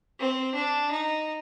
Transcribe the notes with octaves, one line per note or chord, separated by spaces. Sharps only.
C4
D4
D#4